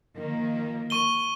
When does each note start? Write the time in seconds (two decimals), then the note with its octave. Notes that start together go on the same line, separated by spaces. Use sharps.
0.17 D#3 F3 A#3
0.90 C#6 D#7 G7